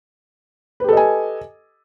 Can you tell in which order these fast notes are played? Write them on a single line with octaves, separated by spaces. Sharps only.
B4 G4 A4 D#5 G#5